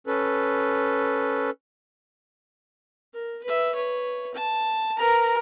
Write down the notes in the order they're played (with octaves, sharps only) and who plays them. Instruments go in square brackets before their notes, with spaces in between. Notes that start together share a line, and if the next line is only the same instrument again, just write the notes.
[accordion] C#4 A4 B4
[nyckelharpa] A#4
B4 E5
B4 C#5
A5
[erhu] A#4 [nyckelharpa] B4 A#5